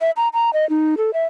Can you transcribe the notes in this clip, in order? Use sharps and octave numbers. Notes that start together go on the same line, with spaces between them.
E5
A#5
A#5
D#5
D#4
A4
E5